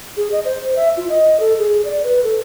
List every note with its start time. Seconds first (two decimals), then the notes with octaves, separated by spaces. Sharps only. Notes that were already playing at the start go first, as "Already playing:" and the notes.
0.17 G#4
0.32 D#5
0.45 C5
0.76 E5
0.97 F4
1.09 D#5
1.40 A4
1.59 G#4
1.85 D5
2.04 B4
2.24 A4